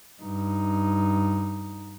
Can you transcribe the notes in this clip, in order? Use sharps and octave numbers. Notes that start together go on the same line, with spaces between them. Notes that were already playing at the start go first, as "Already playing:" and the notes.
G2 D#4